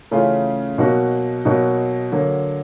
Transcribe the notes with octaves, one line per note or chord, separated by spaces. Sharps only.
C#3 E3 A3 C#4 F4
B2 F#3 A#3 D#4 F#4
B2 F#3 A#3 D#4 F#4
D3 F#3 A#3